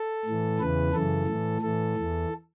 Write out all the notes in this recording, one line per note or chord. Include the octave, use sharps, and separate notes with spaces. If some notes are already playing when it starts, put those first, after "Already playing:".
Already playing: A4
A2 E3
E2 C#3 E3 B4
F#2 C#3 E3 A4
A2 E3
A2 E3 A4
E2 E3